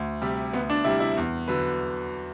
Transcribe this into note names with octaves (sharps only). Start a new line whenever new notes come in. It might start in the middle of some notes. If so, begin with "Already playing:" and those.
Already playing: D2
C3 G3
D2 B3
D4
C3 G3 E4
E4
E2
D3 F#3 B4